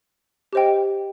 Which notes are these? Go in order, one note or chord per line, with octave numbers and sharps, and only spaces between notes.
G4 C5 D#5 G5